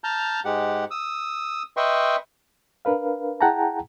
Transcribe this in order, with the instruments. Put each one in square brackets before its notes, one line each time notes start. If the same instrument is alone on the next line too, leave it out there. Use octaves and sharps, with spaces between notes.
[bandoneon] A5 A#5 F6 G6
G#2 G#3 G4 F#5
D#6 E6
B4 D#5 E5 G5 C6 C#6
[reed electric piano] D4 A#4 B4 F5
E4 G#4 F#5 G5 A5 A#5